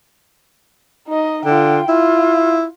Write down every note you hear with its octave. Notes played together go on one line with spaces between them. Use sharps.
D#4 D#5
D3 F4 G5
E4 F4